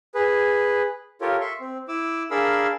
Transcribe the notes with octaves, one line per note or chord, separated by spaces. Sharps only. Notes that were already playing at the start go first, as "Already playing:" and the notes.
G#4 B4
F4 G4 A4 A#4 C#5
E5 C6 C#6
C4
E4 D6 E6
D4 G#4 A#4 F5 B5 E6